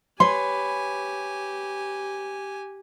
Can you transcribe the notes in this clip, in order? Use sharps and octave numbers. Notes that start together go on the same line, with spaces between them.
G4 B4 C#5 G#5 C6